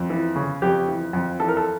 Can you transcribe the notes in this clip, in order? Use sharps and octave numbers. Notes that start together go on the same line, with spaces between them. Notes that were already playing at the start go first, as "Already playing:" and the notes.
Already playing: F2
E3
C#3
F2 G4
E3
F2
E3 A4
A#4
A4